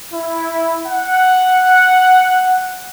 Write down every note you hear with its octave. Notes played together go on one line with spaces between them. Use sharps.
E4
F#5